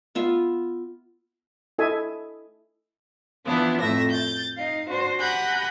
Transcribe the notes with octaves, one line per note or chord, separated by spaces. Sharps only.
B3 F4 E5
E4 A4 D#5 E5 G#5
E3 F3 B3 D4 E4
F2 A2 A3 E5 A#6
G6 A6
D#4 F5
D4 F#4 C5
G4 F#5 G#5 A#5 B5 G6